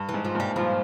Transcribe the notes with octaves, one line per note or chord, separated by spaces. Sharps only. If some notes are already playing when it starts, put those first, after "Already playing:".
Already playing: G2
E3
G#2
F3
G2 A#2 G3
G2 A#2 F3